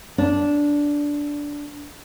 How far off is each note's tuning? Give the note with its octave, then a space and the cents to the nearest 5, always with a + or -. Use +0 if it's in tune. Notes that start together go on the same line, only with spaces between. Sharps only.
D4 -10